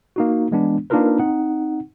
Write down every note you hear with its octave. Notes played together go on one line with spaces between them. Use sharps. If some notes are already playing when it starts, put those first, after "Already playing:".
A#3 D#4 F#4
E3 G#3 B3 D4
A#3 D4 D#4 F4 A#4 B4
C4 D#4 F#5